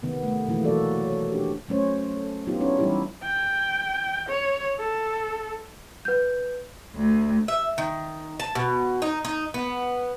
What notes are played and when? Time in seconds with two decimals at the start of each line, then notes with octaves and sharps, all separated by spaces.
0.02 C3 D#3 B3
0.23 A3
0.48 B2 E3 F3 A3 A#3 E4
0.64 E3 F#3 F#4 A4 A#4 D5
1.04 C#5
1.32 D4 G4
1.68 F#3 A3 C#4 C5 C#5
2.16 A4
2.47 F#3 B3 D#4 F4 G4
2.61 C#4 D4 E4 C#5
2.79 E3 G3 D#4 E4 G4
3.23 G5
4.29 C#5
4.79 A4
6.05 B4 G6
6.96 D2
7.48 E5
7.78 D#3
8.40 A5
8.55 B2
9.02 D#4
9.25 D#4
9.54 B3